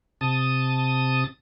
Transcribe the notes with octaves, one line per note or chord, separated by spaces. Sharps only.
C3 A5 D#6